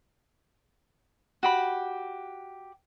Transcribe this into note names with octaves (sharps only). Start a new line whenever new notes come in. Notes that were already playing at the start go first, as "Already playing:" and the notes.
F#4 G4 B5